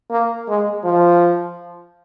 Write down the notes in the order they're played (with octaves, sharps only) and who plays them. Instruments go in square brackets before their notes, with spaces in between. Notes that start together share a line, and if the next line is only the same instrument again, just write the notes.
[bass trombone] A#3
G#3
F3